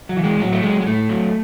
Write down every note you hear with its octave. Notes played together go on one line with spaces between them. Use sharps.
F#3
E3
G#3
A2 F#3
A3
F#3 G#3
G#3
A2 A3
F#3